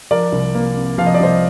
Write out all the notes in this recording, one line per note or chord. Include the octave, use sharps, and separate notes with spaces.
F3 A#4 D5
C2
A#3
C3
F3 F5
D#5
D5
C2 C5 D#5